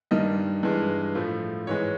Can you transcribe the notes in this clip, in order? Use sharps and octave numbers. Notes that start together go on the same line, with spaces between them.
G2 D#3 G3 D#5
G2 E3 G#3
A2 F3 A3
G#2 E3 G#3 C#5